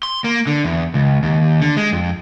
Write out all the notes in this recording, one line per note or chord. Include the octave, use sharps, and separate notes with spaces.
C6
A#3
D3
E2
C#2
D#2
D3
G#3
F2